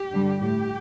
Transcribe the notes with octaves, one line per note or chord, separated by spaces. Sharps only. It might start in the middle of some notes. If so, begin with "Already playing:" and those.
Already playing: G4
G2 D3 G3
A2 G3 G4